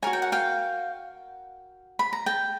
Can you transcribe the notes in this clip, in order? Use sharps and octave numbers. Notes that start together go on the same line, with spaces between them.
F#4 A#4 C#5 G#5
G5
F#5
F5 G5
B5
A#5
G5 A5